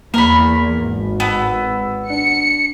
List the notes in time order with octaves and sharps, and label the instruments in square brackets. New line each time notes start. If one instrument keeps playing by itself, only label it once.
[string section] E2 [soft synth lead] A#3 [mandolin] A#4 B5
[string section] G#1
[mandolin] B3 [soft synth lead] E6
[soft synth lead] D4 [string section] C#7